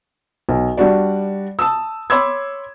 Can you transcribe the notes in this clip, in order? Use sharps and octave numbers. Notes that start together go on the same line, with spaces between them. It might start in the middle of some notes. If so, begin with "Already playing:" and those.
B1
G3 D4 F#4 D5
A5 D#6 E6
C#5 B5 C6 D6 E6 G#6